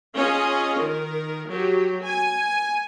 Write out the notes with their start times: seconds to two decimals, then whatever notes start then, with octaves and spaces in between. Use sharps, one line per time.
0.15 C#4 F4 G#4 D#5
0.77 D#3 A#4
1.48 F#3 G4
2.02 G#5